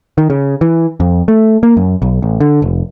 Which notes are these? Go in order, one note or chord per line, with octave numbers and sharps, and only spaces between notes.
D#3
C#3
E3
F2
A3
A#3
F#2
B1
A1
D3
F1